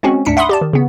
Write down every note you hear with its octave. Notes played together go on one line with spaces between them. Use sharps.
G#3 C4 C#4 F#4
D2 G#2 D4 B6 C#7
E5 F#5 B5 C6 D#6
G4 D5 A5
D#3
C#3 B3